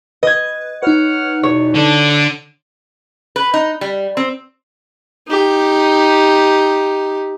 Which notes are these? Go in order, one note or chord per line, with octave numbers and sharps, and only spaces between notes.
B4 D#5 G#6
D#4 B4 C#5 F#5 F6
E2 B2 C#5
D3 A4 D5
B4
D#4
G3
C4
D#4 G4